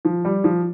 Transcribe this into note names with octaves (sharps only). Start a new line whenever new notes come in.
F3
G3
F3